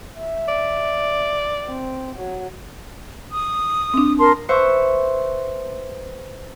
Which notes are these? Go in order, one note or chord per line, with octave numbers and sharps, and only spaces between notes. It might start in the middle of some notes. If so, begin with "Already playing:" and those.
E5
D5
C4
F#3
D#6
C4 D4
A#4 A5 C6
B4 C5 E5 C#6